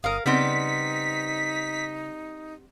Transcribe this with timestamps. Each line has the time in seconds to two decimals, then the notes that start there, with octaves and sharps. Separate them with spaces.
0.04 G1 A#4 F5 D#6
0.26 C#3 G3 B3 C4 D#4 B6